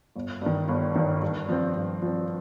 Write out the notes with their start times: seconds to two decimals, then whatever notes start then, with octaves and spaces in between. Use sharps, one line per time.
0.16 G1
0.42 G2 D#3
0.68 G1
0.95 G2 D#3
1.22 G2
1.48 F3 C4
1.76 G2
2.02 F3
2.07 C4